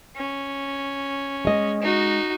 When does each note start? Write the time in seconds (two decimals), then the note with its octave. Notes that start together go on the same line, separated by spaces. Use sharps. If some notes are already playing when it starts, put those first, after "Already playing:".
0.16 C#4
1.45 G#3 D#5
1.82 D#4 F#4